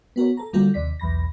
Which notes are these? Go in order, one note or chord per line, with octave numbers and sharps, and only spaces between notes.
B3 F#4 A#4 C#5
A4 A#5
D3 G3 A#3 F4 F#4 A4
D#2 C3 D5 B6
B1 E2 B5 A#6